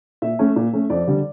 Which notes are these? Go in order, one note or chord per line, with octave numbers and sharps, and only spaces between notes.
A#2 E5
A3 C#4
A#2
A3 C#4
F2 D5
D3 G3